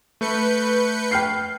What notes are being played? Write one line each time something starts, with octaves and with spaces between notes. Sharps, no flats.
A3 B4 G6 C#7
G5 F6 C7